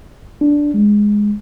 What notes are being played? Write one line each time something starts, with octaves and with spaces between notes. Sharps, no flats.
D4
G#3